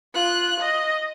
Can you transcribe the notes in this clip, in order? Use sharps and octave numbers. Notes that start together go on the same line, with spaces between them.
F4 F#6
D#5